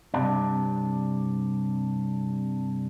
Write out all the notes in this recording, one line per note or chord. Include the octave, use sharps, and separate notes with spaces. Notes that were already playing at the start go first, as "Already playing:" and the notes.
G2 C3 D4